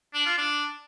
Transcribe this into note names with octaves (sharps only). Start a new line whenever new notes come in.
D4
F4
D4